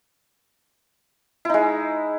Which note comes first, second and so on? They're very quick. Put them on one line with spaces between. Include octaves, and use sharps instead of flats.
E4 D#4 G#3